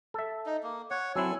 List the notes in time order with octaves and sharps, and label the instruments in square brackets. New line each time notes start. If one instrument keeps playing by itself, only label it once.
[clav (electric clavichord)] A4 E5
[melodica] D#4
A#3
C#5 F#5
[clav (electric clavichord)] F#3 C4 E4 [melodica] A4 G#5